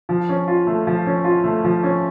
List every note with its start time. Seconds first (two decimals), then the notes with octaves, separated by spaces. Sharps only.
0.09 F3
0.29 C#4
0.48 F4
0.67 A3
0.87 F3
1.06 C#4
1.25 F4
1.44 A3
1.64 F3
1.83 C#4